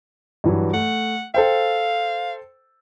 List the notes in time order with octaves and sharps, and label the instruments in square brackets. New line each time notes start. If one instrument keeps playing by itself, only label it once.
[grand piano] G2 E3 F#3
[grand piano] A3 [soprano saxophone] F#5
[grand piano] A4 C5 G5 [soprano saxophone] F5